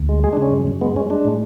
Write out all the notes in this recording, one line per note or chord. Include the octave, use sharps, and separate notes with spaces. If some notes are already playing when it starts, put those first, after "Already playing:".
Already playing: D2
G#3
G#3 G#4
D4
C#3
C#4
F#2
F#2
G#3 B3
G#3 C#4
G#3 D4
A2